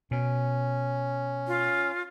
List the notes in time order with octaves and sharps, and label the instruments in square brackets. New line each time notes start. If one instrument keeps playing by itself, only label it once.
[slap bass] B2 [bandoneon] C#4
[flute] F4